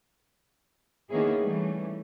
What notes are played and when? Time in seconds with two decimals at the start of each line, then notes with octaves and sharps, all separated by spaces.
1.09 D#3 A#3 B3 C#4 E4 G#4
1.40 E3 G3 A3 C#4